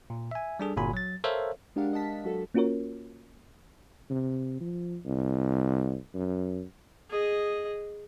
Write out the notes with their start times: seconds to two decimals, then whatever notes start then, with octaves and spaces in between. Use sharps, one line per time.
0.10 A#2
0.31 E5 G#5
0.59 G3 D4 G#4 A4
0.77 G1 A#2 F#4 G#5 B5
0.93 F#3 A6
1.24 A4 A#4 C5 C#5 E5 F5
1.76 G#3 D4 G4 A#4 F5 F#5
1.93 D#5 F#5 A5 B6
2.24 F#3 F#4 A4
2.54 A#3 C#4 F4 F#4 A#4 C#5
4.10 C3
4.61 F3
5.05 C2
6.14 F#2
7.10 G#4 D#5